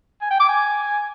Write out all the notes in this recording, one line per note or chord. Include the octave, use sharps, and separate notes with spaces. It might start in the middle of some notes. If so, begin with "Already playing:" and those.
G#5
G5
D6
G#5